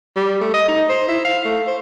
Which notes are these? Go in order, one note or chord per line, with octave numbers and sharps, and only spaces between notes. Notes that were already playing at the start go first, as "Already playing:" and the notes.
G3
A3
D#5
D#4
C5
E4
F5
A3
C5